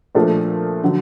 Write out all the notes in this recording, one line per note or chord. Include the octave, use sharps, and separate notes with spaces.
A#2 F3 A3 D4
D3 F#3